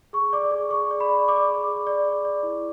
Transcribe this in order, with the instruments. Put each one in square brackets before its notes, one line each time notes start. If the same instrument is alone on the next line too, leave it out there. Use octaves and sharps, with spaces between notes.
[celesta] G#4 C#6
D5 D6
G#4
G#4 C#6
D5
B5
D5
D5 D6
G#4
G#4
D5
G#4
D5
E4